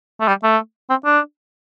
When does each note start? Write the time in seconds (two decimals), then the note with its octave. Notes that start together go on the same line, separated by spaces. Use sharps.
0.20 A3
0.28 G3
0.43 A3
0.90 C4
1.05 D4